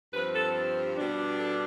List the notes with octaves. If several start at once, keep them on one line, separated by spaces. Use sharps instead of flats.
G2 F3 C4 B4
A4
B2 G3 D4
A4